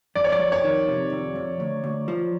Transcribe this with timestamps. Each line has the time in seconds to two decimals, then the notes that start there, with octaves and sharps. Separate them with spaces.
0.15 F2 D5
0.24 C#5
0.32 D5
0.39 F2
0.52 C#5
0.64 D#3
0.88 C3
1.12 F2
1.35 F2
1.60 D2
1.84 D2
2.08 F3